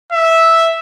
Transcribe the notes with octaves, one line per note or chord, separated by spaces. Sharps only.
E5